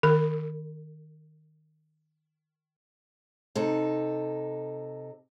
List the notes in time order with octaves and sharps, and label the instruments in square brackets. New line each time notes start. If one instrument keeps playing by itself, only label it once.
[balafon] D#3 A#4
[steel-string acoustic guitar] C3 D#4 A4